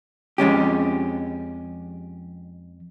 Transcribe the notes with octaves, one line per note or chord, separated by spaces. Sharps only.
F2 G#3 C#4 G4